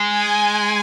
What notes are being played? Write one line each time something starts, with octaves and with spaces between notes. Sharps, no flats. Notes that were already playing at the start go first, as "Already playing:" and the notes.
Already playing: G#3
G#5